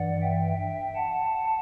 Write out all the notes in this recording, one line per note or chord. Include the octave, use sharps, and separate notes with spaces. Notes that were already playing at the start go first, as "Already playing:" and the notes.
Already playing: G2 E3 D5 F#5
E5 G5
E5 G5
F#5 A5